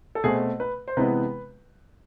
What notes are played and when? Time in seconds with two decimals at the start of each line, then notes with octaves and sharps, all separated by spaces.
0.15 A4
0.24 B2 A3 C4 G#4
0.60 B4
0.88 C5
0.97 C3 E3 G#3 B3 B4